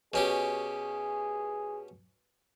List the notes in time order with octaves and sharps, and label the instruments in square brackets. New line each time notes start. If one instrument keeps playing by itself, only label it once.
[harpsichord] B2 C#4 G4 [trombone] G#4